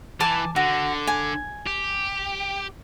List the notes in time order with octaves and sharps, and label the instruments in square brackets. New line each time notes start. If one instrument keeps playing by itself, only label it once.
[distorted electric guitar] E3 [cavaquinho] G#5 A5 D6
[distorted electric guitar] D3 [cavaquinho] F#4
[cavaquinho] G#5
[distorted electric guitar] G4